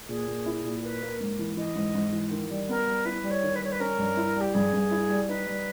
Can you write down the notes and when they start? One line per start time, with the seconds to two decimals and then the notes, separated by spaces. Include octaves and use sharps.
0.09 A#2 G#4
0.28 A#2
0.46 E4
0.64 A#2
0.83 A#3 B4
1.02 A#3
1.20 G#2
1.39 E3
1.57 E3 D#5
1.76 G#2
1.95 G#2
2.12 E3
2.31 D#3
2.50 G3
2.69 B3 A#4
2.87 G3
3.05 E4 B4
3.24 G3
3.31 C#5
3.43 D#3
3.56 B4
3.61 G3 C#5
3.72 B4
3.80 C#4 A#4
3.98 G2
4.17 E4
4.36 G3 G4
4.54 G2 G#4
4.73 G2
4.91 E4
5.10 G3
5.29 D#4 B4
5.47 G3